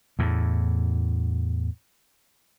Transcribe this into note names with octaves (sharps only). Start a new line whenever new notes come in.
E2 A2